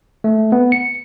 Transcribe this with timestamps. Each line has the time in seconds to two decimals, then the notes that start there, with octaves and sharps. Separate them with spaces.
0.24 A3
0.52 B3
0.72 C#7